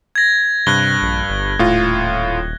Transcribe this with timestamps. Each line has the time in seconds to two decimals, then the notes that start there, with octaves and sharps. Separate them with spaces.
0.15 G#6 A#6
0.67 G2 C3 F#6 G7
1.02 A#1
1.30 G1
1.59 D#1 A2 F4